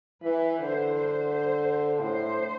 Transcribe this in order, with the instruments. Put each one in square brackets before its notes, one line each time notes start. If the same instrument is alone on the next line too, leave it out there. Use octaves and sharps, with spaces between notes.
[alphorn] E3 [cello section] B4
[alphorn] D3 [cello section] C5
[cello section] C5
C5
[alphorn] A2 [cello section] C5